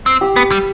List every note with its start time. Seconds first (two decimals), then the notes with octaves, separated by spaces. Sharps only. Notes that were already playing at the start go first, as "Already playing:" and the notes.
0.06 C4
0.21 G4
0.36 B3
0.51 G3